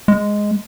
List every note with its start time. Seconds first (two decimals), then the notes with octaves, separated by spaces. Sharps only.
0.08 G#3